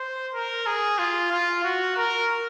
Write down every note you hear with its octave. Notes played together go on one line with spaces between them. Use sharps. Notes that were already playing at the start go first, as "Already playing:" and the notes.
Already playing: C5
A#4
G#4
F4
F4
F#4
A#4